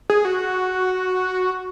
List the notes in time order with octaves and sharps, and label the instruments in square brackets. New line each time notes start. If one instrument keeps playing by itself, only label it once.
[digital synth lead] G#4
F#4